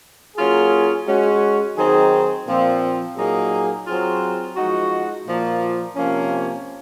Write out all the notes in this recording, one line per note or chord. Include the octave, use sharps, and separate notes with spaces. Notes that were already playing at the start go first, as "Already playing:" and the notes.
F#3 A#3 C#4 F4 G#4
G#3 C#4 F#4
D#3 F#3 C4 D#4 G#4
A#2 F3 C4
A#2 F#3 A#3 D#4 G#4
F#3 C4 F4 G#4
F3 G#3 D#4 F#4
A#2 F3 A#3
C3 F3 A#3 C#4